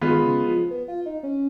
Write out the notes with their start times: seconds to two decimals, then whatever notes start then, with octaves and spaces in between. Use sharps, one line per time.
0.01 D#3 G#3 B3 F4
0.25 C#3
0.48 F3
0.71 B3
0.88 F4
1.06 D#4
1.23 C#4